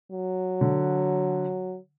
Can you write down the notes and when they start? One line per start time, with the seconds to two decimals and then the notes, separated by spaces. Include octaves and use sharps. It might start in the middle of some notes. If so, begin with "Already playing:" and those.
0.11 F#3
0.61 D3